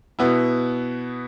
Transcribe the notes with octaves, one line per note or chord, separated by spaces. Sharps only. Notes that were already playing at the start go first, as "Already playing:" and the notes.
B2 B3 E4